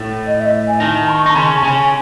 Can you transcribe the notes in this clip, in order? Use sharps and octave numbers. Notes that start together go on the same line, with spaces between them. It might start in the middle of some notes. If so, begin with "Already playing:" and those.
Already playing: A2 A3
D#5
E5
G#5
D#3 D#4 A5
C#6
D#4 A5
C#3 C#4 C6
C#3 C#4 G#5